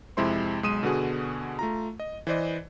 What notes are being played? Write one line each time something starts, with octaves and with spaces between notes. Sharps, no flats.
F2 C3 G#3 E4 C5 C6
B1 G#3 C6 D#6 D#7 E7
B2 D3 B3 F#4 G#4
A3 F4 A#5
D#5
E3 B4 C5 D5 D#5